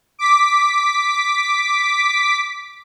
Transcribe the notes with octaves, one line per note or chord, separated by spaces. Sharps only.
D6 B6